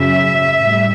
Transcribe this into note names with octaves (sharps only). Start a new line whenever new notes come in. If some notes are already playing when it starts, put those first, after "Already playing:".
Already playing: F#2 C#3 F#3 E5
A2 G3